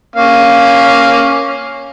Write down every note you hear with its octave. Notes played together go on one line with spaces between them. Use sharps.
A#3 C#4 F5